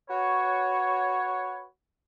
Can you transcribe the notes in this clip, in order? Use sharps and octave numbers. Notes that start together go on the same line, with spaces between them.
F#4 B4 C#5